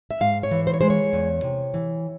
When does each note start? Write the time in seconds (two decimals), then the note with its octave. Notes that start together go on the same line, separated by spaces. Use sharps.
0.11 E5
0.20 G#2 F5
0.43 C#5
0.51 E3
0.67 C5
0.74 C#5
0.81 G#3 C5
0.90 C#5
1.13 E2
1.43 C3
1.74 E3